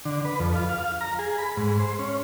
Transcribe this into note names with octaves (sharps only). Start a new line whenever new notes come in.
D3
B4
F2
F4
F5
A#5
G#4
B5
G#2
C5
C#4